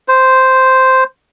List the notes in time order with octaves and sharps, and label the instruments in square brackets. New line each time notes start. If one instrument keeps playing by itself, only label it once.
[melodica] C5